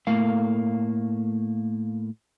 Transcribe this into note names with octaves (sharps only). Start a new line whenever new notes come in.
A2 A3 A#3 F5